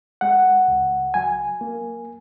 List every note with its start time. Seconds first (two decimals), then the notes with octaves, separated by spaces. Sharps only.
0.21 G#3 F#5
0.68 C#2
1.14 F#3 G#5
1.61 A#3